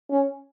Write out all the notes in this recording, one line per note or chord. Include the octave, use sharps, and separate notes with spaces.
C#4